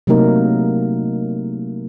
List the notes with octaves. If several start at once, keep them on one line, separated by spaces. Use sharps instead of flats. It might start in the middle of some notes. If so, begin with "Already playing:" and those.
C3 F#3 A3 A#3 D#4 A#4